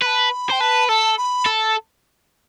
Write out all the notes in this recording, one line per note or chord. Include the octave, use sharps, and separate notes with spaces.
B4 A5 B5
B5
C5 G5
B4 A5
A4 A5
B5
A4